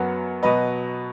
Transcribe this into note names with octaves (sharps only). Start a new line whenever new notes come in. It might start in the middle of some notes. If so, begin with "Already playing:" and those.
Already playing: F#2 F#3 B3 F#5
B2 F#3 B3 B4 D#5